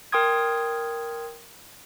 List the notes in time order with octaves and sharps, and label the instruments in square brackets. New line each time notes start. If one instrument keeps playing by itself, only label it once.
[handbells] A#4 G5 C6 D#6 G#6